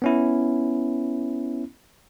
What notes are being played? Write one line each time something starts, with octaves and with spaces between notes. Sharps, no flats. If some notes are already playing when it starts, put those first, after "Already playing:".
B3 C#4 E4